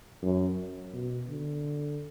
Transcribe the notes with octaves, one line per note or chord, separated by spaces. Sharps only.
F#2
B2
D3